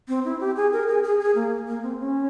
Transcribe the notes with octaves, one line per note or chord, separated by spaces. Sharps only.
C4
E4
G4
G#4
A#4
G#4
G#4
G#4
A#3
A#3
C4
C#4